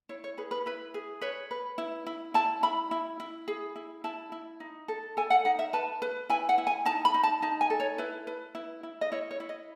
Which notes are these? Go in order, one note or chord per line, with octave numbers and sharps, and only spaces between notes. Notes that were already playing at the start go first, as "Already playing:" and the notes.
E4 C#5
C#5
G#4 B4
B4
E4 B4
G#4
B4 C#5
B4
E4
E4
E4 A5
E4 B5
E4
E4
G#4
E4
E4 A5
E4
D#4
A4
A4 G#5
F#5
D#4 F#5
E5
B4 A5
B4
E4 G#5
F#5
E4
G#5
D#4 A5
B5
D#4
A5
D#4 A5
G#5
A4
C#5
E4 B4
B4
E4
E4
D#5
E4 C#5
C#5
E4
D#5